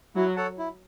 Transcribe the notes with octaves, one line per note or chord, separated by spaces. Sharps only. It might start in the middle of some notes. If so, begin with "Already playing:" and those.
F#3 E4
A4 C#5 F#5 A5
E4